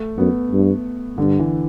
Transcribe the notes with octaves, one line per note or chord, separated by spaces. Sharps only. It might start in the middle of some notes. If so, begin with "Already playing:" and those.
Already playing: A3
F#2 B3
G2
G2 D3
E3